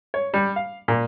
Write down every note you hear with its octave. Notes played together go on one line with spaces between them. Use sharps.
C#5
G3
F5
A#2